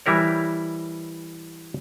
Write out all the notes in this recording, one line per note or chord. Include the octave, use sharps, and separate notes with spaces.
E3 G3 E4 A#4 C#5